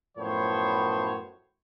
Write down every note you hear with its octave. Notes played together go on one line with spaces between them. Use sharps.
F#2 A2 F3 B3 C5 C#5